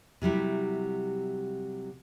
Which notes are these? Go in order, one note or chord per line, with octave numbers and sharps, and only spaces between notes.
C3 F#3 G3 E4